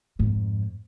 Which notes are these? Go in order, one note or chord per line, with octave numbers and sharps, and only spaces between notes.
F2 G#2